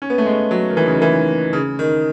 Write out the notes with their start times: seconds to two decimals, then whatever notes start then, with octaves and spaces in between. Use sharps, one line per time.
0.02 C#4
0.10 B3
0.18 A3
0.26 G#3
0.51 F#3
0.70 D#3
0.77 E3
0.86 C#3
0.94 D#3
1.02 E3
1.53 C#3
1.79 D#3